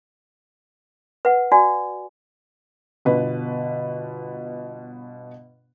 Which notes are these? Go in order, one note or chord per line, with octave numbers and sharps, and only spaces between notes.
B4 F#5
F#4 D5 G#5
G1 B2 B4